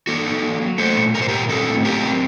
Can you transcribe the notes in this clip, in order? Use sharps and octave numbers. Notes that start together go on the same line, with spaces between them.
A#3 F#4 A4
D#4
A#3
F#3
A3 A4 C5
A#2
A3 A#4
C5
A#2 G4 A#4
C4 F#4 A4
A2
F#3 G4 A#4
C4